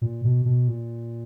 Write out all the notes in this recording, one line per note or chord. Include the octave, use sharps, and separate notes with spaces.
A#2
B2
B2
A#2